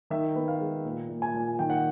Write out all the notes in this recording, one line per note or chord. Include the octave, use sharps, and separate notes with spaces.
D#3 E5
B3
F5
G#3
A#2
A#2
G#5
A#2
D#3 G5
F#5